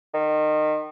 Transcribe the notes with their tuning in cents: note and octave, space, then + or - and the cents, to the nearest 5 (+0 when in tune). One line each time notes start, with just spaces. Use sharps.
D#3 -25